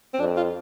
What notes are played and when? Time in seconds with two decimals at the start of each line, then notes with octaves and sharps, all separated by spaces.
0.14 C4
0.19 F2 D4
0.37 F4